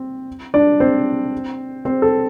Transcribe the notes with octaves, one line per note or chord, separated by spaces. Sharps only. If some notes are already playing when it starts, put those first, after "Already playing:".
Already playing: C4
D4 D5
C4 C5
C4 C5
A4